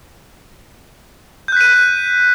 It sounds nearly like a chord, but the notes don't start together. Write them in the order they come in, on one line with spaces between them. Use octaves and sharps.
G6 F#6 B6 D#7